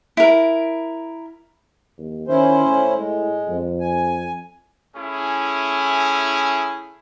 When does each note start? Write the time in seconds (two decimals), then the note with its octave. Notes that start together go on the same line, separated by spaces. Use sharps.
0.17 E4 A#4
1.98 D#2
2.28 D#3 C#4 E4 C5
2.65 A2
2.96 G#3
3.48 F2
3.80 G#5
4.95 A3 C#4 E4 G#4